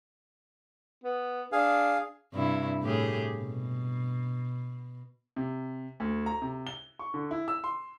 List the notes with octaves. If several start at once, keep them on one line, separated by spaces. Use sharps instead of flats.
B3
D4 G#4 F5
G2 C3 E4
A2 G4 G#4
B2
C3
D2
A#5
C3
G7
C#6
D3
E4
E6
C6